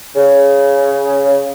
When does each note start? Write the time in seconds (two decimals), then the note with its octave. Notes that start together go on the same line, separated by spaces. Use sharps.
0.15 C#3